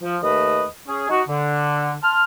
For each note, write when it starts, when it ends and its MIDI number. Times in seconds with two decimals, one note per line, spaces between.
0.01 0.16 53
0.22 0.64 39
0.22 0.64 57
0.22 0.64 71
0.22 0.64 75
0.88 1.05 61
0.88 1.05 68
1.09 1.21 63
1.09 1.21 66
1.29 1.93 50
2.02 2.24 81
2.02 2.24 84
2.02 2.24 89